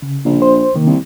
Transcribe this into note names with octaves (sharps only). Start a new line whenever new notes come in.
C#3
A#1
C5
C3 D#3 A#3
C2